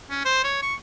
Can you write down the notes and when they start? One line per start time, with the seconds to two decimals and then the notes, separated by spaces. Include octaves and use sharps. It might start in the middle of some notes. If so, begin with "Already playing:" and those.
0.10 C#4
0.25 C5
0.44 C#5
0.63 C#6